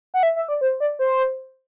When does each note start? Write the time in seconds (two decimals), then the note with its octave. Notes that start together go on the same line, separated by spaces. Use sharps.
0.14 F#5
0.23 E5
0.36 E5
0.48 D5
0.61 C5
0.80 D5
0.99 C5